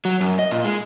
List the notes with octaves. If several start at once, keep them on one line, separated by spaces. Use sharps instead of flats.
F#3
F#2
D#5
A#2
G#3